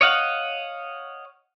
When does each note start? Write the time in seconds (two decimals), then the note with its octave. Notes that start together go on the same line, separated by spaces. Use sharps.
0.01 C#5 D#5 F5 F#5